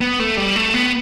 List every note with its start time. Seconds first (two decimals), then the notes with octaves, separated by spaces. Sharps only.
0.01 B3
0.19 A3
0.37 G3
0.56 A3
0.74 B3